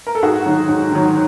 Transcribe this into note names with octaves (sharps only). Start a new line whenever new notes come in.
A#4
A4
G#2 F#4 G#4
D#3 F#3
G#2
D#3 F#3